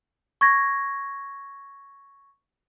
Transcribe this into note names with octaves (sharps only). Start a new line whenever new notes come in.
C#6 G#6 A#6